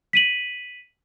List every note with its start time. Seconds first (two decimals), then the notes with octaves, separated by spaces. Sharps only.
0.13 B6 D#7 F#7